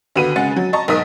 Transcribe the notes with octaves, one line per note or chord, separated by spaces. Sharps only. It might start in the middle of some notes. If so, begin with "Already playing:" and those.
D#2 D3 B3 F#4 B4 D#7
C#3 G#3 F#5 A6
F#3
D#5 A5 A#5 C#6 A6
B1 G#2 A#4 D#6 B6